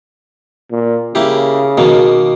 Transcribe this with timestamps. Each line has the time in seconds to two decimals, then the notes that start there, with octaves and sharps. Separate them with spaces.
0.71 A#2
1.15 C#3 A#3 E4 G4
1.78 B2 D#3 A#3